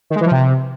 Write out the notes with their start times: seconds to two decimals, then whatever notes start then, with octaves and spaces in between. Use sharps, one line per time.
0.10 D#3
0.16 G#3
0.21 E3
0.26 F3
0.31 C3